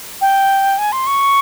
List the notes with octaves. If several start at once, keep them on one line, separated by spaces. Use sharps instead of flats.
G5
G#5
C6
C#6